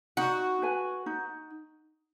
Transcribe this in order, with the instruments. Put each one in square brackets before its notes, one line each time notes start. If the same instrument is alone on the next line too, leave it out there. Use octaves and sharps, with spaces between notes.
[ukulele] D#4 [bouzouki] F#4
[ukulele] B4 G#5
D#4